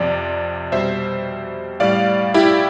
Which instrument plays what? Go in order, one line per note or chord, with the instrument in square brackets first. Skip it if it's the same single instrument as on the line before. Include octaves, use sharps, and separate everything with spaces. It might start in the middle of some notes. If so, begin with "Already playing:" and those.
Already playing: [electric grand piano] F2 C3 F3 D5
B2 G3 C5 E5
A2 G3 D5 F5
E4 G4